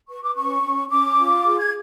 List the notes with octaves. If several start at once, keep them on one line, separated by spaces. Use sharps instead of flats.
B4 C#6
D6
C#4 C#6
C#4
C#4 D6
F4
G#4
G#6